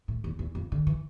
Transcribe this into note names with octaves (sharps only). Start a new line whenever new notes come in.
A2
E2
E2
F2
D3
E3